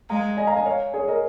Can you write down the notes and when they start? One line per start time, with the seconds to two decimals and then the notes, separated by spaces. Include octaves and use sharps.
0.10 G#3 F5 A#5
0.37 D#5 G#5
0.47 F5 A#5
0.56 D#5 G#5
0.66 C#5 F5
0.93 G#4 C#5
1.08 A#4 D#5